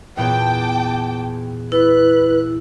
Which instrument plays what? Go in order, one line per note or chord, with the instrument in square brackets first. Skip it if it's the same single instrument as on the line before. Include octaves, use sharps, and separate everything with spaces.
[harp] E2 A#2 B3 [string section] G5 A5 D6
[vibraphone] E4 [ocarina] B4 [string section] F#6